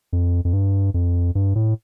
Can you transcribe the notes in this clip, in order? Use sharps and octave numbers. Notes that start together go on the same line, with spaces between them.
F2
F2
G2
F2
G2
A2